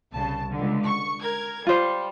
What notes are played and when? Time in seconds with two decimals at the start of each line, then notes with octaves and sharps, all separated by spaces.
0.14 C2 C#3 A5
0.51 C#2 D3
0.85 C#6
1.22 A#4 G#6
1.67 G3 F4 C5